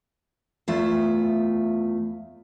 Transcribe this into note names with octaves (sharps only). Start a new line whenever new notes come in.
E2 A3 F4 E5